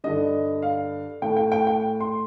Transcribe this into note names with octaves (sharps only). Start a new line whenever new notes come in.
G2 D3 D#5
F5
A2 G5
G5
G5
G5
C6